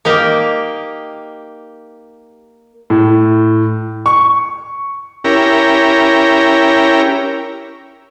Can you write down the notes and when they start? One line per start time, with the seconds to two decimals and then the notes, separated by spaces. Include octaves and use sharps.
0.05 A#3 D#4 G4
2.90 A2
4.06 C#6
5.24 C#4 E4 G4 A#4